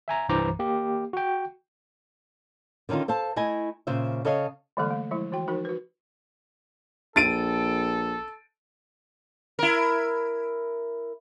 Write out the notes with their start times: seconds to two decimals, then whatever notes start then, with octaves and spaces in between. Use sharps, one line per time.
0.08 E5 G#5 A#5
0.29 C2 G2 E3 C5 A#5 D6
0.59 A#3 G4
1.13 F#4 G5
2.89 D3 D#3 C#4 D#4 F4
3.08 A4 C5 F5 A5
3.36 A3 E4 D#5 G#5
3.87 A#2 C#3 C5 E5
4.25 C#3 A4 C#5 D#5 F5
4.77 D3 E3 G3 G#3 A#3 A4
4.91 A3
5.11 F3 G#3 E4
5.32 E3 F#4 G5
5.48 F3 D#4 F#4 A#4
5.65 F#4 B4
7.16 A#1 A4 A6 D7 D#7
9.59 E4 A#4